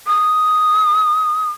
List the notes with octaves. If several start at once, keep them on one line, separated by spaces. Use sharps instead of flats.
D#6